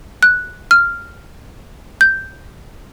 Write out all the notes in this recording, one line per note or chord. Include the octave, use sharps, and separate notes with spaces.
F#6
F6
G6